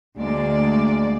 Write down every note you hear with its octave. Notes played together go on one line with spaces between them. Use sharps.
D2 G#3 A#3 D5